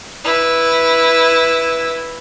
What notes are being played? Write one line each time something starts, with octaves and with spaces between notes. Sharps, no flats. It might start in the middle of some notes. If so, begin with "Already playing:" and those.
E4 B4